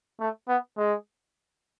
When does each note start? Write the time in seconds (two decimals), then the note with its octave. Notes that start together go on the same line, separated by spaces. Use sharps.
0.20 A3
0.48 B3
0.77 G#3